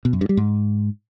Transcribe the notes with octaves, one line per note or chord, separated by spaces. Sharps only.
B2
F#2
G2
G3
G#2